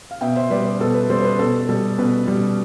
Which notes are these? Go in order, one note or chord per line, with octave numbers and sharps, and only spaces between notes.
F5
B2 E5 G5
C5 E5
G3 B4 D5
B4
B2 A4
B4
G3 A4 C5
C5
B4
B2 A4
G3 A4
B2 B4
G3